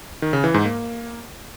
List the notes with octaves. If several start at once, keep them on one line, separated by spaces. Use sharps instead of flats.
D#3
C#3
E3
G#2
A#3